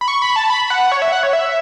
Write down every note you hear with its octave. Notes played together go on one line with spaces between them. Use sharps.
B5
C#6
B5
A5
B5
F#5
C#5
E5
F#5
C#5
E5